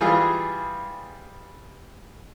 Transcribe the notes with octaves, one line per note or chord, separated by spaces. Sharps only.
E3 G3 F4 G#4